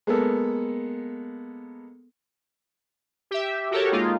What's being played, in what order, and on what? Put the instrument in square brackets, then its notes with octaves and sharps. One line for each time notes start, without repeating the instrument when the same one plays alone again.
[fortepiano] G#3 A#3 B3 A4
[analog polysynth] G4 E5
F#4 G4 A4 A#4 C#5
G#3 A#3 D#4 F4